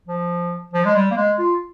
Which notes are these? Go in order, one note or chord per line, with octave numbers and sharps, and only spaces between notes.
F3
F3
G#3
G3
A#3
G#3
F4